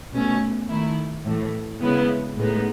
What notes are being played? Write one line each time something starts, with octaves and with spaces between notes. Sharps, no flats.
B2 A3 C#4
D#3 A3 E4
A2 E3 A3
C#3 G#3 B3 E4
A2 G#3 B3 D#4